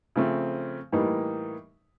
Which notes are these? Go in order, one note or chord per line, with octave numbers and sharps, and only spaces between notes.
C#3 F3 A3 C4
A2 E3 G3 A#3 D#4